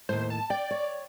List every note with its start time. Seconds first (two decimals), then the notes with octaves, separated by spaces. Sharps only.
0.09 D#2 A2 C5
0.30 A5
0.50 D5 G5
0.71 C#5